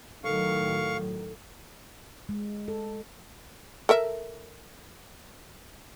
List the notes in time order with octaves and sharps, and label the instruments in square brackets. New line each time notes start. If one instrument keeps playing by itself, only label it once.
[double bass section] A2 D#3 F#3 [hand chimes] A4 [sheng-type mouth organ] F5 C#6
[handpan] G#3
A4
[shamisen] A4 A#4 E5